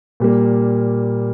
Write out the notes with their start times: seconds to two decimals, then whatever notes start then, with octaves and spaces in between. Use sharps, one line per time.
0.20 A#2 G3 A#3